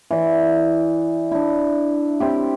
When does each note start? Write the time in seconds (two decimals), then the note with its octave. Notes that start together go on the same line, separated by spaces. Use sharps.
0.11 E3 D5
1.31 D4 E4
2.20 C4 E4 G4